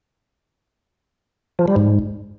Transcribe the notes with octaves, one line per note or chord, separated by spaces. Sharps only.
F3
G3
G#2